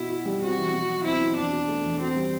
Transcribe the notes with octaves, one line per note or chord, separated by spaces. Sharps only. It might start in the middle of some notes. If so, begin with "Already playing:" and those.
Already playing: B2 E4
F#4
G3
C4 F#4
E3
B2
F#3
C4 E4
B2
E2 D4
B2
A3
E2
C4 F#4
G3